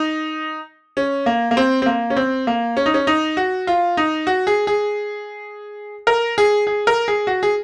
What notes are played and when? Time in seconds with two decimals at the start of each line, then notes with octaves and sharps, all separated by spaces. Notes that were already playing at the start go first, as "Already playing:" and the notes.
Already playing: D#4
0.97 C#4
1.26 A#3
1.51 A#3
1.57 C4
1.82 C4
1.86 A#3
2.10 C#4
2.17 C4
2.47 A#3
2.77 C#4
2.86 D#4
2.94 C#4
3.07 D#4
3.37 F#4
3.67 F4
3.97 D#4
4.27 F#4
4.47 G#4
4.67 G#4
6.07 A#4
6.38 G#4
6.67 G#4
6.87 A#4
7.08 G#4
7.27 F#4
7.43 G#4